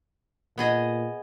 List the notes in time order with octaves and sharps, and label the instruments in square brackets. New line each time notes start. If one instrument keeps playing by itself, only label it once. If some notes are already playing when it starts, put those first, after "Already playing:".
[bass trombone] A#2 [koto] B3 G#4 D#5